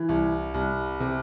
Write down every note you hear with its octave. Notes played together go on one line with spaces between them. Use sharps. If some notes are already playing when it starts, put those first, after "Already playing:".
Already playing: E3
C2
C2
C3